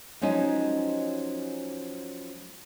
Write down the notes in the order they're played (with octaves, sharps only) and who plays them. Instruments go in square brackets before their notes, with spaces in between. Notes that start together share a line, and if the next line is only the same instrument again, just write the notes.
[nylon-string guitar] F3 F#3 G#3 C#4 D#4